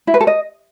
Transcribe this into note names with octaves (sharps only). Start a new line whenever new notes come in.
E4
B4
A4
D#5